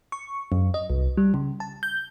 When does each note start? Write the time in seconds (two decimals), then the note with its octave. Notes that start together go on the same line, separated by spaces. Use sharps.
0.12 C#6
0.52 F#2
0.74 D#5
0.90 C2
1.17 G3
1.34 C#3
1.60 A5
1.83 G6